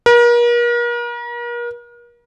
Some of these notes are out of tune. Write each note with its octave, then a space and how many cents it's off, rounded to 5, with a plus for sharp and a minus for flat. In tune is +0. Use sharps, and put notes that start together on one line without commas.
A#4 +40